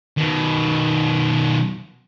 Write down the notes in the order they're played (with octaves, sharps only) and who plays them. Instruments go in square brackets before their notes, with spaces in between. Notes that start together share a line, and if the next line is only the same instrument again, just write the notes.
[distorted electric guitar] B2 D#3